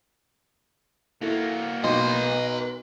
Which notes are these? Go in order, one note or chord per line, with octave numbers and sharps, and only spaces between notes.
A#3 E4 F#4 A4
B1 B4 D#5 C6